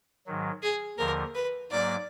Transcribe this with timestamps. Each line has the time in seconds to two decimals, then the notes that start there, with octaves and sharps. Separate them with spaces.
0.26 G#2 D#3 F#3
0.62 G#4
0.98 D#2 D3 F3 A#4
1.35 B4
1.71 G#2 F#3 A#3 D5